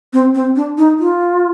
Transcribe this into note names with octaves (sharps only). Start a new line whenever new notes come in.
C4
C4
D4
D#4
F4